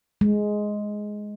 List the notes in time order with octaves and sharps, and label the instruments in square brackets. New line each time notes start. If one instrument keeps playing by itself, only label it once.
[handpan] G#3